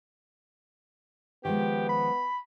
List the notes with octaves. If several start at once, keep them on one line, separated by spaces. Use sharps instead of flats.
D#3 F3 G#3 B3 G4
B5